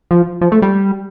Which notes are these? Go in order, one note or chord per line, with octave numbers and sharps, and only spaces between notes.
F3
F3
A3
G3